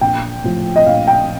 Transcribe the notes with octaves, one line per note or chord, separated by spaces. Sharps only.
A#1 G5
A2 F3
D#5
A#1 F5
G5